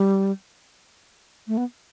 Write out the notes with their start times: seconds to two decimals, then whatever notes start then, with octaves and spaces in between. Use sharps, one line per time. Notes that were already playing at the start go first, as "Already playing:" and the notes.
Already playing: G3
1.48 A3
1.57 B3